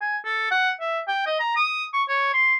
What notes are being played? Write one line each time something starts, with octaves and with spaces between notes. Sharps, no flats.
G#5
A4
F#5
E5
G5
D#5
A#5
D#6
C#6
C#5
C6